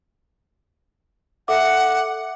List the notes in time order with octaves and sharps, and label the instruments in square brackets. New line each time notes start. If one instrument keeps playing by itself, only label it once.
[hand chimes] A4 E5 D6 [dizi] F#5